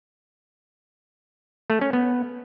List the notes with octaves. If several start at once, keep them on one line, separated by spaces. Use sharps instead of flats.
A3
C#4
B3